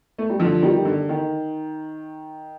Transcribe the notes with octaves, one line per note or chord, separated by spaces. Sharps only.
A3
G3
D3 F3
D#3 G3
D3
D#3